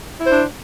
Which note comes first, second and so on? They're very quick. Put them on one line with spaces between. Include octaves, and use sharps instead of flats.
E4 C5 D4